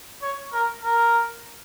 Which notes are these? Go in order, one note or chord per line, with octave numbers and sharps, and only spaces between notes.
C#5
A#4
A#4